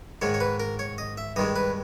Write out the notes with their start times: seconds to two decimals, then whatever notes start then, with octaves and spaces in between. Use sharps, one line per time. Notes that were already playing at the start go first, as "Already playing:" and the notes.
0.22 G#2 D#3 G#3 C#5
0.34 C#5
0.40 B4
0.60 A#4
0.79 C#5
0.98 D#5
1.18 E5
1.36 G2 D#3 G#3 D#5
1.56 B4